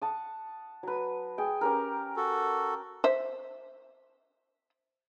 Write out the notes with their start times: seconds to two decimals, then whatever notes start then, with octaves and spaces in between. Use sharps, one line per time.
0.02 F#5 A5 D#6
0.83 F#3 B4
1.38 G#4 G5
1.61 C#4 G4 A#4
2.16 F#4 A4
3.04 C5 E5